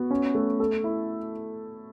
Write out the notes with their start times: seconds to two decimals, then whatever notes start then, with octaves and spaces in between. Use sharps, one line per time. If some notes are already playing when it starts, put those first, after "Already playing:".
Already playing: B3 F#4
0.11 C#4
0.35 A3
0.60 A4
0.84 E4